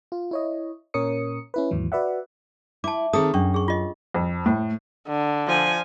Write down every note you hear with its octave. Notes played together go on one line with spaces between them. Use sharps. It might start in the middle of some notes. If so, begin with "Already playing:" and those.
F4
E4 C#5 D#5
A#2 C#4 A#4 C#5 D#6 C#7
C#4 E4 B4
D#2 G#2 E3 F#3
F#4 B4 D5 E5 F#5
E4 A5 D6
D#3 C4 G#4 A4 D#6
F#2 C#4 D4 C#6
G#4 C#6
F4 D#5
F2
A2
D3
F3 G#5